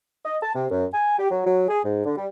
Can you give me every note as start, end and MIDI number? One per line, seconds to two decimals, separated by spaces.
0.25 0.36 75
0.42 0.55 81
0.55 0.65 48
0.70 0.85 42
0.93 1.18 80
1.18 1.29 67
1.30 1.42 54
1.45 1.67 54
1.69 1.80 68
1.84 2.03 44
2.05 2.16 50
2.16 2.26 55